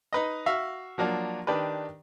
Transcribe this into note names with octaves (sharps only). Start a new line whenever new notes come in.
D#4 B4 D#5
F#4 E5 F5
F3 F#3 A#3 D4
D#3 D4 G4 B4